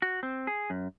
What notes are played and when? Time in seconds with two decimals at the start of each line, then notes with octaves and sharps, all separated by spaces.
0.02 F#4
0.23 C4
0.47 G#4
0.70 F#2